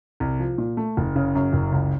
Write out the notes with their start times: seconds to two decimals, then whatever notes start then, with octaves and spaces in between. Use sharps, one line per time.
0.20 C2
0.39 F3
0.58 A#2
0.77 A3
0.97 F#1
1.16 C#3
1.35 F#2
1.53 F#1
1.72 C#2